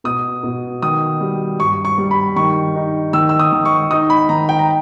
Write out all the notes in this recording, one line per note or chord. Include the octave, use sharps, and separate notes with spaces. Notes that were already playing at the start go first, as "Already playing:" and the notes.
B2 D#6
B2
D#3 D#6
G3
G2 C#6
C#6
G3
B5
D#3 C#6
D#4
D#3 E6
E6
D#6
D#3
C#6
D#4 D#6
B5
D#3 A#5
G5
A#5